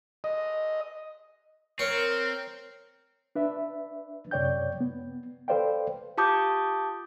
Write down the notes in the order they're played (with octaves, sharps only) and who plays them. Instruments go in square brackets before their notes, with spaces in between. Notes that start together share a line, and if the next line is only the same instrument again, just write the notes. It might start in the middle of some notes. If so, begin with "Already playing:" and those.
[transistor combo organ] D#5
[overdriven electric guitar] C4 [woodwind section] A#4 [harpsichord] C#5
[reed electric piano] D4 B4 E5
F#2 C3 C#5 D5 G5 G6
B3
A4 B4 C5 D5 F5 G5
[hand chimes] F4 G4 A5 D6 D#6 G6